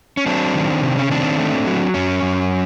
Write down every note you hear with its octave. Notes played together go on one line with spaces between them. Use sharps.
C#4
F#3 C4 D4
D#3
C3
C#4
D#3 C4 D4
A3
F#3
F#2 C#4
F#2